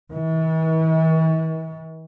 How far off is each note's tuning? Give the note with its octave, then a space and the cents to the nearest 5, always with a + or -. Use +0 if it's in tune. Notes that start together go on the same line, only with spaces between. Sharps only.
E3 -45